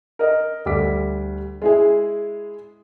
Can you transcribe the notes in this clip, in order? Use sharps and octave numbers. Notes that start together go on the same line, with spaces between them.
A#4 D#5
D2 G3 D6 B6
G#3 E4 G#4